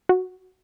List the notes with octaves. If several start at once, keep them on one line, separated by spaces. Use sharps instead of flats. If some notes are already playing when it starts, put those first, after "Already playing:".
F#4